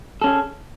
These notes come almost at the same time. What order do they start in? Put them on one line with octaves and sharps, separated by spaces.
A4 C#4 G#4